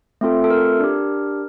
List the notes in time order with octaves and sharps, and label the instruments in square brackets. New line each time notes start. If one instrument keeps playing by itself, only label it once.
[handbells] A3 C4 F4 A4
A4
A#4
D4 G4